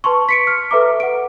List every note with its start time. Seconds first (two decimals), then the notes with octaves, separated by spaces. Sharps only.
0.04 B4 A5 C6 C#6
0.29 B6 C#7 D7
0.47 F6
0.71 A4 B4 E5 A#5 D6
1.00 F#5 D7